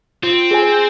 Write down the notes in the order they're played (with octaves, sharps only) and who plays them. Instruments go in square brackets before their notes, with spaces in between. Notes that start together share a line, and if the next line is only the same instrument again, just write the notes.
[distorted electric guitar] C4 [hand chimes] F4
[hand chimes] G#4 C5 G#5